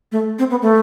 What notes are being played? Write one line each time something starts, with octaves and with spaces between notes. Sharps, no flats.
A3
C4
B3
A3